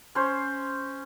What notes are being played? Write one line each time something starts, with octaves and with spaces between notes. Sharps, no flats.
C#4 C5